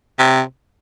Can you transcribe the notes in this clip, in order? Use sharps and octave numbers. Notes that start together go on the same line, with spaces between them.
C3